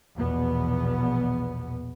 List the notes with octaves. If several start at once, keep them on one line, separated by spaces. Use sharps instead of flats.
A#1 E2 B2 B3